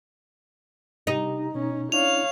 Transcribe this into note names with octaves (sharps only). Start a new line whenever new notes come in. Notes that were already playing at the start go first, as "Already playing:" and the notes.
C3 D#4 G4
B2 C#4
C#4 D4 E4 C#5 F5 F7